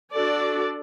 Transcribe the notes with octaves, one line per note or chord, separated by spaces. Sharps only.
D4 F#4 A4 D5